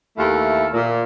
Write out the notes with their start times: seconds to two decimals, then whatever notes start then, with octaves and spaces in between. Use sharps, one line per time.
0.17 D#2 A3 E4 A4 F5
0.73 A#2